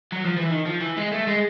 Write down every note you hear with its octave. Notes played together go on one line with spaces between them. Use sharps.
F#3
F3
E3
D#3
F3
E3
G#3
A3
G#3